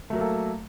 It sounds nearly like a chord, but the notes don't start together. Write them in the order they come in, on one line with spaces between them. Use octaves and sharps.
A3 F#3 A#4 A#3 A4